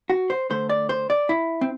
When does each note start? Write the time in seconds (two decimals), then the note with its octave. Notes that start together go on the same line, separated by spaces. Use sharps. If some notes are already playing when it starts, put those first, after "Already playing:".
0.10 F#4
0.30 C5
0.50 D3 A3 C5
0.69 D5
0.89 C5
1.10 D5
1.29 E4
1.61 C4